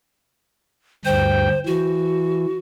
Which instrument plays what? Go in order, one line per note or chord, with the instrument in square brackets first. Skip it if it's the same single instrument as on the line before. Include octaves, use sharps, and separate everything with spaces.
[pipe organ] D2 G2 G5 [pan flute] C5
[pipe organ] E3 [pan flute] F#4